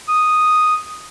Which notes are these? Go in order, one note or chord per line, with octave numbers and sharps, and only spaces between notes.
D#6